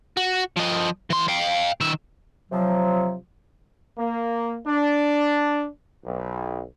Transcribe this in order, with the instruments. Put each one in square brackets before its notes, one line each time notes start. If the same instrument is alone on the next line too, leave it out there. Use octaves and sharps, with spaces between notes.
[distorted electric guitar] F#4
F3 D#5
E3 C6
F5 G5
D#3 E5
[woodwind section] C3 F3 F#3
[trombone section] A#3
D4
B1